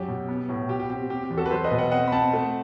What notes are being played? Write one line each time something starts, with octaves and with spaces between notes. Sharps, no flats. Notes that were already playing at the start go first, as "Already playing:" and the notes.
Already playing: F#2 F#3 G4
B2
B3
A2
B2 G4
G4
C4 G4
C4 G4
G4
E2
F#4 A4
B4
F#3 A4 C5
B4 D#5
B2
D#5 F#5
C4 D#5 F#5
B5
C4 F#5 A5
A3